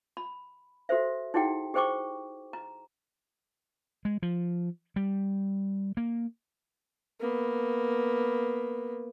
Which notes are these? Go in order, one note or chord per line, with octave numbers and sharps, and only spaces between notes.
B5
F#4 A4 C5 E5
D#4 E4 F#4 G#4 F#5 G5
G4 G#4 C5 G5 C#6 D6
A#5
G#3
F3
G3
A#3
A#3 B3